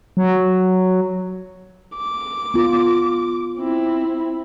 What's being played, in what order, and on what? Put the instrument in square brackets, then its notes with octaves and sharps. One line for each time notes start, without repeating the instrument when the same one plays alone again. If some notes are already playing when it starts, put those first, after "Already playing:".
[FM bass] F#3
[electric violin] D6
[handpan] B3 F4
[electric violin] C4 E4